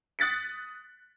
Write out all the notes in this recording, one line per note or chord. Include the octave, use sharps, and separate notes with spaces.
D#6 F#6 A6 B6 C#7